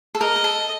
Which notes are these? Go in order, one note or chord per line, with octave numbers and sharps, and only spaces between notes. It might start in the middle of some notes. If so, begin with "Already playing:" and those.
A4
A#4 D#5
A#4
A4